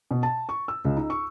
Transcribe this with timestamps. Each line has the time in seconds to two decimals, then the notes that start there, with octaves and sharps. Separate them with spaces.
0.11 B2
0.23 A5
0.49 C#6
0.68 E6
0.85 C#2
0.97 D#4
1.10 C#6